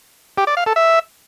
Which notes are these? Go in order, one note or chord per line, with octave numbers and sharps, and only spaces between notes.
G4
D5
F5
A4
E5